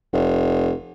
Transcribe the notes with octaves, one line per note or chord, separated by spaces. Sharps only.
F1